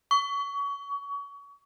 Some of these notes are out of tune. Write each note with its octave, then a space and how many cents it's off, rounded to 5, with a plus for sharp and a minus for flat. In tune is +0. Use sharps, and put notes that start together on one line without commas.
C#6 +30